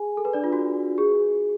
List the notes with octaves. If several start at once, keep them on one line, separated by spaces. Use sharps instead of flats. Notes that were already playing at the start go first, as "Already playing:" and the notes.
Already playing: G#4 G#5
A4
B4
D4 D5
F4
F#4
G#4